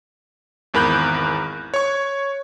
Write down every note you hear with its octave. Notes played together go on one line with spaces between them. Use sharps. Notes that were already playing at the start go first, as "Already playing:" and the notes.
G#1 E2 A#4 B5 F#6 G6
C#5 C#6